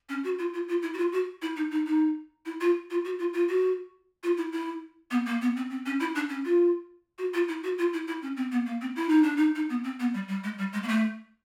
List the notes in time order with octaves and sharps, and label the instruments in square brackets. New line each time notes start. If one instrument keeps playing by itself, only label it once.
[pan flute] C#4
F#4
F4
F4
F4
E4
F#4
F4
F#4
E4
D#4
D#4
D#4
E4
F4
F4
F#4
F4
F4
F#4
F4
E4
E4
B3
A#3
B3
C4
C4
C#4
E4
D4
C#4
F4
F#4
F4
E4
F#4
F4
E4
E4
C#4
C4
B3
A#3
C4
E4
D#4
D4
D#4
D#4
B3
C4
B3
G3
G3
G#3
G3
G#3
A#3
A3